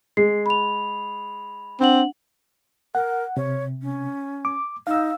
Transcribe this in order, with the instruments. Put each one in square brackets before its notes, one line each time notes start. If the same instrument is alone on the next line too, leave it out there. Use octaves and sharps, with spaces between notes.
[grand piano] G#3 [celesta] C7
[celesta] B5 F7
[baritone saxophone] C4 [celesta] D4 F#5 F#7
[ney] A#4 [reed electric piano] F#5
[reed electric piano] C3 [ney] C#5
[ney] C#4
[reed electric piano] D6
[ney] D#4 [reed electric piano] F5 E6